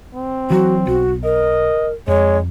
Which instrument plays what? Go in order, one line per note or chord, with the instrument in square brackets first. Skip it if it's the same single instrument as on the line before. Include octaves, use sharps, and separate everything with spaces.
[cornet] C4
[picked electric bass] E3 F#3 [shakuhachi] F#4
[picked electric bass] B1 [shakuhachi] F#4
[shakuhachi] A#4 [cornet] D#5
[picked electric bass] F2 [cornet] G#3 [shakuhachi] C#5